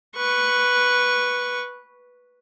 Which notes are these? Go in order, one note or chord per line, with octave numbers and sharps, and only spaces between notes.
B4 C#6